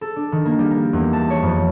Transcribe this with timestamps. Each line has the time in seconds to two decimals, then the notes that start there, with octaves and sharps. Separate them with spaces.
0.01 A4
0.16 D4
0.32 D#3
0.45 A#3
0.59 G3
0.71 A#4
0.93 E2
1.13 A5
1.30 C#5
1.43 F2